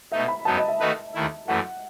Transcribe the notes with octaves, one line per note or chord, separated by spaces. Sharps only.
B2 A3 D#4 E5
B5
F#2 F#3 B3 D#4 A5
D#5
E5
D#3 A3 D#4 F#4 B4
D#2 D#3 A3 E4
F#2 E3 A3 F#5